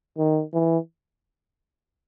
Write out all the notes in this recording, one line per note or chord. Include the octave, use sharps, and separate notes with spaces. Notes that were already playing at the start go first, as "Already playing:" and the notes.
D#3
E3